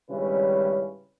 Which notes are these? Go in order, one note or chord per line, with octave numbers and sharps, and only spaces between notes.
G#1 C#3 G3 C#4 E4 B4